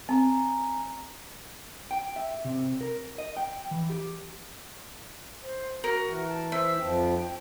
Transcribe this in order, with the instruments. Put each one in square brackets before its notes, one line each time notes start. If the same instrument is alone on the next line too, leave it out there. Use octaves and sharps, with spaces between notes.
[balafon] C4 [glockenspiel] G#5 A#5
[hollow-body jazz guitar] G5
E5
C3
A#4
D#5
G5
E3
G4
[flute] C5
[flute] F#4 [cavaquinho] A#4
[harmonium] E3
[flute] A5
[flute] C5 [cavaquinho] E5
[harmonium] F2 F3 [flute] G5